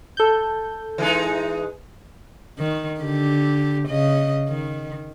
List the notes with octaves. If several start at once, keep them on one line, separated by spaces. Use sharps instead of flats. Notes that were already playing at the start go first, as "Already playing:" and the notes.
A4 G6
E3 G#3 D#4
D#3
D3 G4
C#3 D#5
D#3